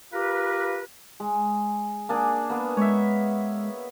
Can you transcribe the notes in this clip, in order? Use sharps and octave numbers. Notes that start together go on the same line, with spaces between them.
F4 G4 A#4 B4
G#3
A#3 D4 G#4
A#3 B3
G#3 C#5 E5